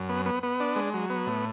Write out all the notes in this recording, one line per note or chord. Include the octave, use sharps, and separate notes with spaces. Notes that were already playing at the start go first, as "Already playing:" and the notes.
Already playing: F#2
B3
B3
B3
D4
G#3
F#3
B3
A2